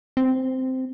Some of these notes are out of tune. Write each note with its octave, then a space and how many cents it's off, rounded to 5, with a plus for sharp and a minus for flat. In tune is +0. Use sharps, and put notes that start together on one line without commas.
C4 -10